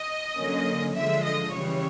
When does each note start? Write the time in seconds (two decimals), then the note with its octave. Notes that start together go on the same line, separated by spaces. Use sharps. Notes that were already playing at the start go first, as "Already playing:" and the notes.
Already playing: D#5
0.36 D3 F#3 A#3 C#4
0.95 D3 F3 G#3 E5
1.24 D#5
1.54 C#3 E3 G3 C#5